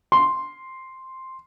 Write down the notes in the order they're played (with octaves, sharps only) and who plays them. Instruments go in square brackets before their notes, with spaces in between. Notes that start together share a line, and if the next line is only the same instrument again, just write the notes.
[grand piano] C6